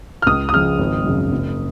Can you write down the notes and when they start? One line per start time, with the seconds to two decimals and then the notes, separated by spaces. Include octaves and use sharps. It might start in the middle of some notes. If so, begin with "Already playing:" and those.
0.22 F6
0.27 C#2 D#6
0.49 D#6
0.53 C#3 F3 F6
0.79 G#1
1.05 F#2 C#3 F#3
1.32 F#1